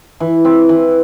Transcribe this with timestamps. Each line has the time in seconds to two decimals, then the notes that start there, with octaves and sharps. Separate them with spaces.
0.20 E3
0.45 C4
0.69 E3